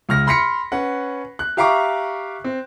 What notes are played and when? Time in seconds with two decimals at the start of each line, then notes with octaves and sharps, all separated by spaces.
0.09 C#2 F6 A#6
0.27 B5 C6 F6 A#6 B6 C#7
0.72 C#4 B4 F#5
1.39 F#6
1.57 G4 E5 F5 A#5 C#6 D6
2.44 C4